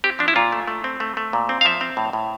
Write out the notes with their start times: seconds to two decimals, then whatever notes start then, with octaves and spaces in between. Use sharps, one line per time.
0.04 C4 G4
0.19 F3 D4
0.28 E4
0.36 A#2 F4
0.52 A3
0.67 A3
0.84 C4
1.00 A3
1.17 A3
1.33 A#2
1.49 C4
1.61 F5
1.65 F3 E5
1.81 C4
1.97 A2
2.13 A2